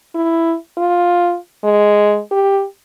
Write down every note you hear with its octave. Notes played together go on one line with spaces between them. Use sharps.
E4
F4
G#3
G4